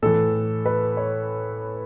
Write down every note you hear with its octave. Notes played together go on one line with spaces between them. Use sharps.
A2 E3 A4
B4
C#5